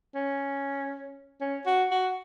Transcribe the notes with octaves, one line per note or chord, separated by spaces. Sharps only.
C#4
C#4
F#4
F#4